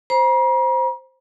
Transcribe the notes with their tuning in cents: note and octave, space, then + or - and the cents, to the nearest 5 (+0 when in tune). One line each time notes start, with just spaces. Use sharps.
C5 +0 A#5 +45